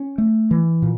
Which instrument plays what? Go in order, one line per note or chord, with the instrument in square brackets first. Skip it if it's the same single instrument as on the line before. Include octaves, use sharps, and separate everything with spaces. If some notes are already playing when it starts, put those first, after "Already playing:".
Already playing: [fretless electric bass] C#4
A3
E3
A#2